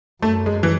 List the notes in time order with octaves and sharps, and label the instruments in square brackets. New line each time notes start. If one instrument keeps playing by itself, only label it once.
[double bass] F#2 [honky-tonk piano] A3
[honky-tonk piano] G#3
E3